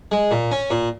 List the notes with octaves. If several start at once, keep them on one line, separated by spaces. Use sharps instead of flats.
G#3
A#2
C#4
A#2